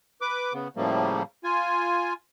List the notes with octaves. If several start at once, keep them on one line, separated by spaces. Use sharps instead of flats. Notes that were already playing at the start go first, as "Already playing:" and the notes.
B4 D6
C#3 B3
A2 C#3 F3 G3 A3 A#3
F4 G#5